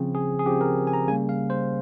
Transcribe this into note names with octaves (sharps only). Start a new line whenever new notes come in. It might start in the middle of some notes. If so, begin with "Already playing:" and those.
Already playing: C#3 F3 C4
G#4
G#4
C#3 F3 C4 G4
A#4
G#5
A#5
C#3 G3 A#3 G#5
F5
C5